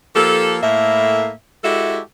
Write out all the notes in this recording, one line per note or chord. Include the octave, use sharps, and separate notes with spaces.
F3 A#3 G4 A4
A2 A#3 E5
G#3 E4 F#4 G4 A4 E5